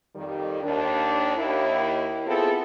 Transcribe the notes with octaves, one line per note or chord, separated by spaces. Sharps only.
F2 D#3 G3
D#2 D4
D#2 E4
B3 C4 E4 F4 G#4 A4